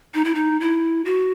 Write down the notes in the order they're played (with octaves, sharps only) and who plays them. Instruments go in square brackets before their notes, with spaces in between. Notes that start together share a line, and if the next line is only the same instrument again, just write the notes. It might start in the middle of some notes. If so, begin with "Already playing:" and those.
[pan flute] D#4
E4
D#4
E4
F#4